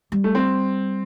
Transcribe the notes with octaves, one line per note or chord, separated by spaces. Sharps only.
G3
A3
C4